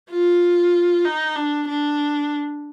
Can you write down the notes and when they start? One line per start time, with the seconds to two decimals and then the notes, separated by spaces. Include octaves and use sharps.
0.11 F4
1.05 D#4
1.36 D4
1.68 D4